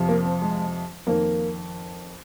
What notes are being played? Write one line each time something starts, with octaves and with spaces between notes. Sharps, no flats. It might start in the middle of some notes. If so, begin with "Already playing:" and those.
Already playing: F2 C3 F3
A#3
C4
G#3
F2 D#3 A#3